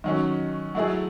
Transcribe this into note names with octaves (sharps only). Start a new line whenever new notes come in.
D#3 F#3 C#4
F#3 A3 E4 G#4